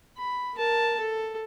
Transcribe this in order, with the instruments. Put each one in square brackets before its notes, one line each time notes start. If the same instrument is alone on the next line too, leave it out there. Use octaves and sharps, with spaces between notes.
[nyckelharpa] B5
A#4 A5
A4